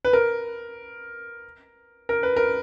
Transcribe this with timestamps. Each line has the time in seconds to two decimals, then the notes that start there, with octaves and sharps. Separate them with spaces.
0.05 B4
0.13 A#4
2.09 A#4
2.23 B4
2.36 A#4